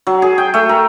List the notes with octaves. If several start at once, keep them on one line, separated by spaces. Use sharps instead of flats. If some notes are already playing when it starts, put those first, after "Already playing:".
F#3
G#4
G5
A3
A#4